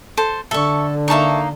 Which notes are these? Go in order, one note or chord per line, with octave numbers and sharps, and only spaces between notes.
A4 C5
D3 A4 E5 C#6
A#3 D#4 E5 A5 C#6